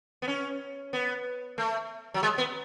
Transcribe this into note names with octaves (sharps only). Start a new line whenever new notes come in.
B3
C#4
B3
A3
F#3
G#3
B3